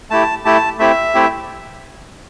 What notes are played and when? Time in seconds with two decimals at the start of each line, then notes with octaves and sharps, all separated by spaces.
0.10 A3 E4 G4 A5
0.45 A3 E4 G4 A5
0.79 A3 C4 E4 G4 E5
1.14 A3 C4 E4 G4